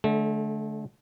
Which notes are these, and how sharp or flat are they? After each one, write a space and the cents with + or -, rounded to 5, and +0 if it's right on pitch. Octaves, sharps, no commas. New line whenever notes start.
D3 +0 A3 -30